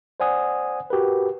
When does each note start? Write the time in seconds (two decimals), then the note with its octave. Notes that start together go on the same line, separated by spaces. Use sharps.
0.20 C5 D5 F#5 G#5 D#6
0.90 F#4 G4 A#4 B4